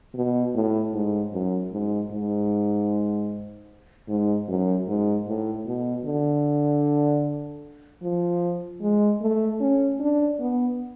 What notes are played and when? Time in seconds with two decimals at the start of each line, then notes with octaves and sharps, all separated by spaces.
0.15 B2
0.54 A2
0.94 G#2
1.33 F#2
1.72 G#2
2.12 G#2
4.09 G#2
4.48 F#2
4.88 G#2
5.28 A2
5.66 B2
6.05 D3
8.03 F3
8.82 G#3
9.22 A3
9.61 C#4
10.00 D4
10.40 B3